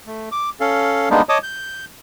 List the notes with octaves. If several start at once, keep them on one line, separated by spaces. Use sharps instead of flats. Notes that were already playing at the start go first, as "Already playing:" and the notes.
A3
D6
C#4 A4 F5
G3 G#3 A#3 B3 D4 D#4
C#5 D#5 A5 D6 D#6
G6